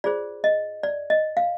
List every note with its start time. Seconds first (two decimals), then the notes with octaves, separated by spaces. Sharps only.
0.04 F4 G#4 C5 D5
0.44 D#5
0.83 D5
1.10 D#5
1.37 F5